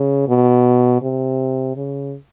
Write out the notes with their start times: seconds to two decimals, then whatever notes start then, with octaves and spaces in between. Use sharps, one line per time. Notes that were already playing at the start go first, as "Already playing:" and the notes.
Already playing: C#3
0.28 B2
1.02 C3
1.76 C#3